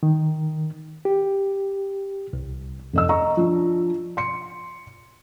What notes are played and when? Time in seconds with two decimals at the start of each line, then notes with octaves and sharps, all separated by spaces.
0.03 D#3
1.05 G4
2.33 C2
2.93 F1 D#5 E6
3.09 D#5 A#5 C#6
3.37 F3 D4
4.17 C6 C#7